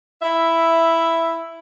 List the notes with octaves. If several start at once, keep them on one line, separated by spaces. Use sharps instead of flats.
E4 E5